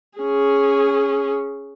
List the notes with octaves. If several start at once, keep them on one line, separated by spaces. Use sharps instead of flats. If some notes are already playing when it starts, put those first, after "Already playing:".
C#4 G#4